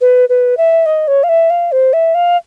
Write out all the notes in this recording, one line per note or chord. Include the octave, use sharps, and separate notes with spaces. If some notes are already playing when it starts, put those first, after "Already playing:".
B4
B4
E5
D#5
C#5
F5
E5
F5
C5
E5
F5